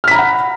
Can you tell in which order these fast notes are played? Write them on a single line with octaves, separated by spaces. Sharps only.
F6 B6 A#5 B5 F#5